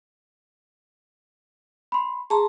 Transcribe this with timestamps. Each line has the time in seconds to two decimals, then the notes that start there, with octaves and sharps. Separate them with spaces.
1.92 B5 C6
2.30 G#4 A5 A#5 C6